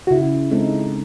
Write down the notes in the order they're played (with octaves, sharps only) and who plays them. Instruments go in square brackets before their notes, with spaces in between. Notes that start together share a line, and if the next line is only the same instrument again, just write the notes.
[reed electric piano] F#4
[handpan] C#3 [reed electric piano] E4
[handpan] G#3 C4 D#4 A4